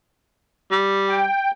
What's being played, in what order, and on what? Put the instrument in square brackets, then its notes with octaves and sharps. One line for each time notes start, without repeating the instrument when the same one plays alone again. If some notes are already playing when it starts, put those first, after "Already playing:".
[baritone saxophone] G3
[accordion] G5